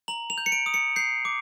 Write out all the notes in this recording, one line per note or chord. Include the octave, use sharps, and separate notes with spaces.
A#5 F#7
F7
G6
C#7
D7
D#6
C#7
G6 C7
D6